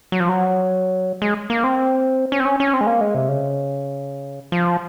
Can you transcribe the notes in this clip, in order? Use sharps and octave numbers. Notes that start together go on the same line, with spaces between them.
F#3
F3
F#3
G#3
A#3
C4
C#4
C4
C#4
C#4
C4
G#3
A#3
G#3
C3
C#3
F3